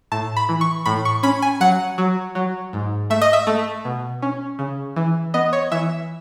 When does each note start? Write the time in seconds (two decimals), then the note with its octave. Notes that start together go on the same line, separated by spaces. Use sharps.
0.12 A2 A5
0.36 B5
0.49 E3
0.61 C#6
0.86 A2 B5
1.05 C#6
1.23 C#4 B5
1.42 G#5
1.61 F#3 F#5
1.98 F#3
2.35 F#3
2.73 G#2
3.10 A3 E5
3.22 D#5
3.33 E5
3.47 A3
3.85 B2
4.22 C#4
4.59 C#3
4.96 E3
5.34 B3 D#5
5.53 C#5
5.72 E3 E5